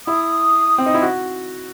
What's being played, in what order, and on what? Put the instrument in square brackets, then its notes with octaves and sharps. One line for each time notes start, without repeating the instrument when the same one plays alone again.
[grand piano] E4 [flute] D#6
[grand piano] C4
D#4
E4
F#4